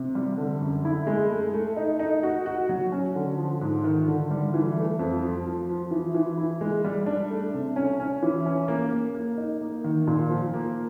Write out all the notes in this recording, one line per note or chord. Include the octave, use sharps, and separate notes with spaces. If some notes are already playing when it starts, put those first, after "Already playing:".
Already playing: C3
G3
D3
F#2
E4
G#3
A3
A3
D#4
D#4
F#4
F#4
F#3
C#4
D3
F3
G#2
D#3
D3
G3
E3
A3
F2
F3
F3
F3
E3
E3
E4
G#3
G3
D4
A3
C3
C#4
C#4
E3
C#4
A#3
A#3
A#3
D#4
A#3
D#3
A#2
F3
A#3